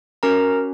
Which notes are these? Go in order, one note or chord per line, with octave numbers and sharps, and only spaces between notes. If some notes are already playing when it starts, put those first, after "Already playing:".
C#4 F#4 A#4 A#5